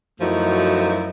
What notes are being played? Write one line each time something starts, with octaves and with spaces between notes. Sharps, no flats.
F#2 F3 A3 D#4 E4 F#4